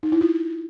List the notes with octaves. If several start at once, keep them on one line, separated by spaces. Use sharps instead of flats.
D#4
E4
F4